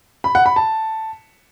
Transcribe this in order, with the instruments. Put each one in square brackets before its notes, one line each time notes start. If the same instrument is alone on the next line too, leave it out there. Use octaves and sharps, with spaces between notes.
[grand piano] B5
F#5
B5
A5